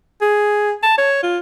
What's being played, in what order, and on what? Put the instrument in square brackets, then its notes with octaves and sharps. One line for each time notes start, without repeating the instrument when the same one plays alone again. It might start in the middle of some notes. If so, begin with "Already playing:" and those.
[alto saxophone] G#4
A5
C#5
F4